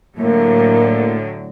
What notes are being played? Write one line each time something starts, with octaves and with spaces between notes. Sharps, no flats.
A2 D3 F#3 A#3